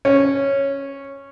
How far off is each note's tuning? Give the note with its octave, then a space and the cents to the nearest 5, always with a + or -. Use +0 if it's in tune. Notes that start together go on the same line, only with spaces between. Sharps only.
C#4 -5